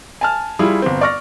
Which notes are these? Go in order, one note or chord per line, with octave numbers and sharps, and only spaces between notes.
G#5 A5 F6
G3 E4 F4 G#4
G1 C4
D5 C#6 F6 A#6